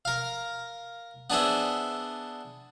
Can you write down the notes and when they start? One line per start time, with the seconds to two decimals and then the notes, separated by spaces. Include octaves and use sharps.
0.05 A#4 F5
1.30 B3 D4 G#4 C5 E5